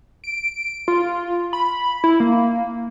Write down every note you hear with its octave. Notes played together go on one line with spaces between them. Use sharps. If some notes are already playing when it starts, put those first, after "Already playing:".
D7
F4
B5
E4
A#3